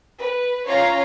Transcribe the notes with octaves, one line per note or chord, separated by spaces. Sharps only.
B4
C#4 F4 C#5 F5 A#5